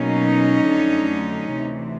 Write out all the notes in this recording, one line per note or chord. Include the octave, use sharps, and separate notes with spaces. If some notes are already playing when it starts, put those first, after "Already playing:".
Already playing: B2 F#3 A#3 C#4 D#4
F2 D3 F#3 A3
D2 C3 E3